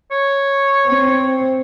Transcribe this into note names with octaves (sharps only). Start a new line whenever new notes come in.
C#5
C4